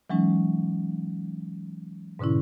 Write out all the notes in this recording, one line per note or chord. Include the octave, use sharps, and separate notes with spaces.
E3 F#3 G#3 C#4 D#4
G#2 B2 D3 C#4 E4